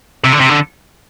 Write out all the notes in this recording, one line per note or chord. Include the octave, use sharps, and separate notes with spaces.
C3
D3
C3
D3